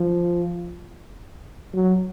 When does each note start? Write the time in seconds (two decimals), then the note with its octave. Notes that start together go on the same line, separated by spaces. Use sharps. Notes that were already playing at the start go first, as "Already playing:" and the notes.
Already playing: F3
1.73 F#3